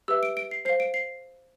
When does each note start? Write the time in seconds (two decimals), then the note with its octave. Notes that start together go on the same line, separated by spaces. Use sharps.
0.08 G4 B4 E5 E6
0.23 D7
0.37 D7
0.51 C7
0.65 C5 F5 C7
0.80 D7
0.94 C7